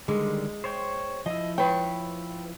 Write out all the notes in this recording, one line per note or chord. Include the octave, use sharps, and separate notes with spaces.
D3 D#3 G3 G#3
C5 C#5 G5
F3 E4 D#5
B4 C#5 G5